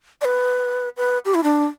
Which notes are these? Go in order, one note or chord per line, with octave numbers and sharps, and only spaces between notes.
D5
B4
B4
G4
E4
D4